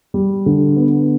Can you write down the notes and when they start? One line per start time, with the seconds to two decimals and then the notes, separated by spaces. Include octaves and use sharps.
0.14 G3
0.46 D3
0.76 B3